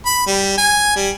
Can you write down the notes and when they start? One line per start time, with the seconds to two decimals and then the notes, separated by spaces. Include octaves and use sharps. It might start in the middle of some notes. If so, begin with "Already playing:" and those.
0.06 B5
0.27 G3
0.58 G#5
0.96 G3